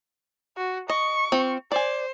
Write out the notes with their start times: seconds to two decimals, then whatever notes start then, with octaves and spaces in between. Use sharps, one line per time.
0.57 F#4
0.89 D#5 C#6
1.32 C4 F4
1.72 C5 D5 G#5